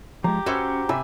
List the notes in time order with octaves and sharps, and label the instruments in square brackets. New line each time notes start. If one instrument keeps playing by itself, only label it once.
[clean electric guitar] F3 G#3 [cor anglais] G4 [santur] A#5
[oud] C#4 B4 E5 [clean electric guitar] F#4 C5
[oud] C3 [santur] E5 G#5 B5